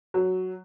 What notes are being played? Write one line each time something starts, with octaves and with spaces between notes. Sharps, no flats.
F#3